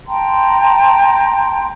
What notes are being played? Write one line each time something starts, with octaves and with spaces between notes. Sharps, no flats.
G5 A5 A#5 C6